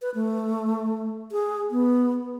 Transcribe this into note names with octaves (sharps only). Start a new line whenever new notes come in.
B4
A3
G#4
B3